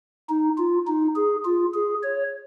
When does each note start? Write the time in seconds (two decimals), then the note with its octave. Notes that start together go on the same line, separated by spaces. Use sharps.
0.29 D#4
0.58 F4
0.87 D#4
1.16 G#4
1.45 F4
1.74 G#4
2.03 C#5